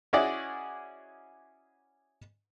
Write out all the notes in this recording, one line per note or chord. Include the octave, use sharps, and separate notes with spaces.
C#4 E4 F#4 G#4 D5 D#5